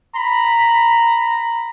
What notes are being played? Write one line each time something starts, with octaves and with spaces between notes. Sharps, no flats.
A#5 B5